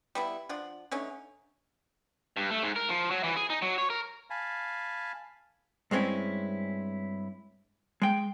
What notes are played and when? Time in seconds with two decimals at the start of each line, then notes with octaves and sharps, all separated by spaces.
0.15 G3 B3 E4
0.49 F3 D4 F#5
0.91 D3 A3 C#4 D#4
2.37 G2
2.50 A3
2.63 G#2
2.76 A#4
2.89 F3
3.11 F#3
3.24 E3
3.37 G#4
3.50 D#4
3.62 F#3
3.78 C#5
3.90 A#4
4.30 F5 G#5 A5 B5
5.91 G2 G#3 C4 C#4 E4
8.02 G#3 G5